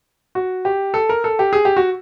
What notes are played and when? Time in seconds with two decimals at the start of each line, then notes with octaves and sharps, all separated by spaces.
0.35 F#4
0.65 G4
0.94 A4
1.09 A#4
1.24 A4
1.39 G4
1.53 G#4
1.65 G4
1.77 F#4